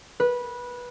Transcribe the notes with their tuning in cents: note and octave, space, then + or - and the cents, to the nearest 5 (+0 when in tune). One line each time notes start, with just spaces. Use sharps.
B4 -15